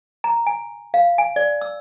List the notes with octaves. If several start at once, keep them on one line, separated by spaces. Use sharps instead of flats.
A#5
G#5
F5
G#5
D5
E6